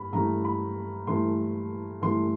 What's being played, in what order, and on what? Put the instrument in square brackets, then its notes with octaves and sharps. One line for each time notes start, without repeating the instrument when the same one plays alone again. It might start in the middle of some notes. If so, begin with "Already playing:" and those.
Already playing: [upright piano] G2 B5
G2 E3 A3 A#5
B5
G2 E3 A3 C6
G2 E3 A3 C6